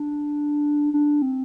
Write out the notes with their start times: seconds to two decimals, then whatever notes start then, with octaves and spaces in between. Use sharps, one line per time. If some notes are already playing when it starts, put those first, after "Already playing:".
Already playing: D4
0.94 D4
1.22 C4